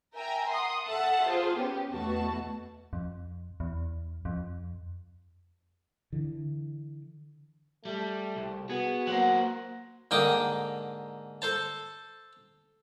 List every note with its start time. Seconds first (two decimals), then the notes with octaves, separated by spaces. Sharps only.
0.15 A#4 E5 G5 G#5 A#5
0.48 F#5 C6 D#6
0.86 A4 E5 F#5 A5
1.24 F4 G#4 C5
1.56 B3 C#4 G4
1.91 E2 B2 A3 F#4 A5
2.93 F2
3.60 E2
4.25 F2
6.13 D3 E3
7.85 G3 A3
8.36 C2
8.70 B3 F#4 G#4
9.07 F#3 A#3 C5 F#5
10.11 G#2 D3 A#3 G5 D6 D#6
11.42 A4 C5 A5